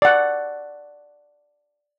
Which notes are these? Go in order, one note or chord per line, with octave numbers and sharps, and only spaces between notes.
D5 F#5